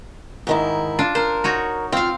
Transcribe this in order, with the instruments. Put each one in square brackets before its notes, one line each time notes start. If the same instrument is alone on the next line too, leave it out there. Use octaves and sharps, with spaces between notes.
[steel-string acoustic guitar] G#2 D#3 E4
[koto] D4 F4
[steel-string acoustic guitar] A#4 [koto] C5
[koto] D#4 F#4 C#5
[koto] C4 F5 [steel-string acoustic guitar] F4